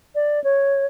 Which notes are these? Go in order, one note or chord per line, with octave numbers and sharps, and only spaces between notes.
D5
C#5